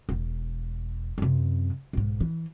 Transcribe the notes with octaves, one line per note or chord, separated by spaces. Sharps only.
E1
F#2 C3
B1 G#2
E3